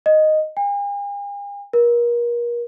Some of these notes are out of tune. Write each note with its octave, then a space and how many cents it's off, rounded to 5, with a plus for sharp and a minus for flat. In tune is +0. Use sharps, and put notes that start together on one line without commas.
D#5 -5
G#5 -45
A#4 +35